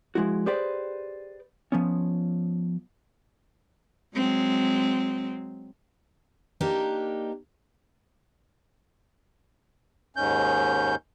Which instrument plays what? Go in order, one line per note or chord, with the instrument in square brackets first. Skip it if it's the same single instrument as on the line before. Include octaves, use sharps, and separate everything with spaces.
[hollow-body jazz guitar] F3 G#3 E4 F#4
G4 G#4 B4 C5 D5 G5
F3 B3 C#4
[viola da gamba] F#3 G#3 C4
[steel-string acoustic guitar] A#3 D4 D#4 G4 A#4
[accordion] D#2 G#2 C#4 G6